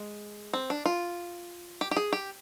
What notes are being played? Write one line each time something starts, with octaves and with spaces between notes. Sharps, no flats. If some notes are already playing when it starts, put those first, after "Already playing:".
Already playing: G#3
C4
D4
F4
G4
G4
G#4
G4